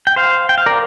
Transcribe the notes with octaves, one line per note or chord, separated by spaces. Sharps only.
G5
C5 F5
G5
F5
A#4 D5